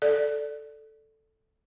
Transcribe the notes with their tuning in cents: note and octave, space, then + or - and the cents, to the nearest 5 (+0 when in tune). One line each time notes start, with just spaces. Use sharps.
A4 +0 D5 +0